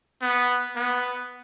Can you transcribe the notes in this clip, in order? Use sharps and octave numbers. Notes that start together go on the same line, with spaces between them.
B3
B3